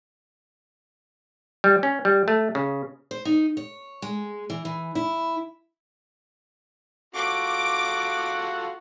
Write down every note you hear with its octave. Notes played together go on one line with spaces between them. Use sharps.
G3
C#4
G3
A3
C#3
C5
D#4
C#5
G#3
E3
E3
E4
F4 F#4 A4 D6